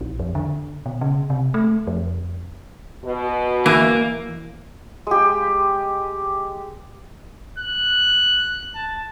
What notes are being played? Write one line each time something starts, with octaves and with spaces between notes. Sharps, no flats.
A#1
F2
D3
B2
C#3
C3
A3
F2
B2
E3 A#3
G#3 G4
F#6
A5